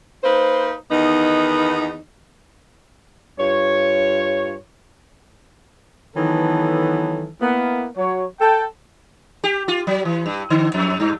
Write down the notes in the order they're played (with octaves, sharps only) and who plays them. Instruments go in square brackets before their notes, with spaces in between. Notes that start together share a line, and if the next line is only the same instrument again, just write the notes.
[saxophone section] A#3 D#4 B4 C5
E2 D#3 B3 D#4
[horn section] G2 F4 C#5
D#3 E3 F#3 B3 A4
A#3 B3 E4
F#3 C#5
A4 G5
[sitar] G4
F4
F#3
E3
G2
D3
F2
G2